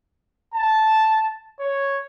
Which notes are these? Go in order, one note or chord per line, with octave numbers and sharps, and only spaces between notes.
A5
C#5